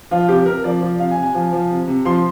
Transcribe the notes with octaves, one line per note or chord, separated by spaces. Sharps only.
F3 F4
C3 G4
C3 A#4
F3 D5
F3
C3 F5
G#5
C3
G#5
F3
F3
C3
C3
F3 C6